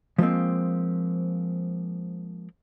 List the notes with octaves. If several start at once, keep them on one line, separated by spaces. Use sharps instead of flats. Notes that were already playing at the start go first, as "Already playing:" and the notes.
F3 G#3 A#3 C4